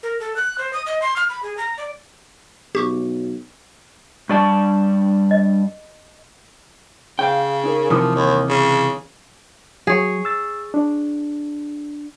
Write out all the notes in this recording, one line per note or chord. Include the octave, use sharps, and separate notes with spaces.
A#4
A4
F#6
C5
D#6
D#5
C6
F6
B5
G#4
A#5
D5
B1 G4 C#6 D6
G2 D5 A5 C#6
D#5
C#3 F5 G5
C#4 D#4 A#4
C3 E3 F3 D6 D#6 F6
D#2
C#3
F#3 G#4 C#5
E6 A6
D4